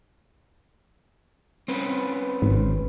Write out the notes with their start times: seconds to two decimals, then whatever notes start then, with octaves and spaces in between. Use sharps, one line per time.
1.68 C4 C#4 B4
2.42 G#1